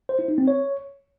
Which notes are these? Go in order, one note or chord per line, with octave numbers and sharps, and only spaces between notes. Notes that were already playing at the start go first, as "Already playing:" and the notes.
C5
E4
D#4
C4
C#5